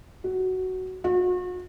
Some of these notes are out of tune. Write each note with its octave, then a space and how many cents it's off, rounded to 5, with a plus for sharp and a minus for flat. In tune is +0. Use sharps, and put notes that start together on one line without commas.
F#4 +10
F#4 -40